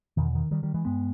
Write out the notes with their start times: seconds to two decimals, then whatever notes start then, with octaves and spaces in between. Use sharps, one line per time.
0.17 E2 B2 D#3
0.35 D#3
0.51 D#3 G3
0.63 D#3 G3
0.74 E3 G#3
0.85 G2 G#3 B3